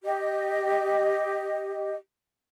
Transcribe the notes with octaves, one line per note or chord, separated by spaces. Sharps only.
G4 D#5